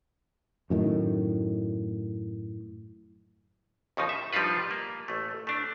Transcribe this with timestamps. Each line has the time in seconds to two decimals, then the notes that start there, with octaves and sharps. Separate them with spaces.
0.70 F#2 A2 D#3
3.97 D#2 C#3 F3 D#4
4.09 E5
4.33 F3 G3 D4 D#4 F4 B4
4.71 A#3
5.08 A1 A3
5.47 A3 D4